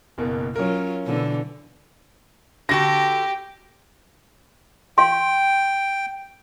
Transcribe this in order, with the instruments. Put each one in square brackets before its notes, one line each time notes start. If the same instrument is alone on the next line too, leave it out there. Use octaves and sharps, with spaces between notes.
[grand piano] F#1 B2 A#3
[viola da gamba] F#3 F4 [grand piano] C#4 A#4
[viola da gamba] B2 D3 E3
[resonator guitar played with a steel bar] D3 F#4 A5 [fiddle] G4 [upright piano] A#6
[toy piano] F5 C6 [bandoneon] G5